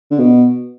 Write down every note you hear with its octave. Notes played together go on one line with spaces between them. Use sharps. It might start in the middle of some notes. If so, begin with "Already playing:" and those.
D3
B2